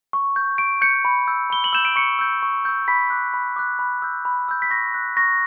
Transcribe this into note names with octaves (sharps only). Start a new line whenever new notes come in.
C#6
G6
C#6 D7
G6 C#7
B5
E6 G6
B5 G7
F#7
E6 G6 E7
D7
C#6 C#7
E6 G6
C#6
E6 G6
B5 B6
D6 F#6
B5
D6 F#6
B5
E6 G6
B5
E6 G6
B6
C#6 A#6
F#6
C#6 A#6